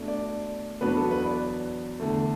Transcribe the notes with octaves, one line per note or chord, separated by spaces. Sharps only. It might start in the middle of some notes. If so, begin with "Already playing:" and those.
Already playing: B2 A3 D4
D5
E2 B2 F#3 B3 D4 B4
A4
B4
D5
E2 D3 A3